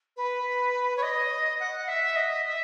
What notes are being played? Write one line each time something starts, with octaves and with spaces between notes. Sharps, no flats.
B4
C#5
D#5
F#5
E5
D#5
E5